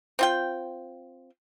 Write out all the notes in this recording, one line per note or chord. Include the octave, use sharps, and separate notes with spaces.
C4 F4 G5